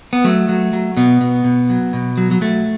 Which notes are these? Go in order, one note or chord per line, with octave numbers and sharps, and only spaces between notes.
B3
F#3 A3
F#3
F#3
B2 B3
B2
B2
F#3
B2
F#3
F#3
F#3 A3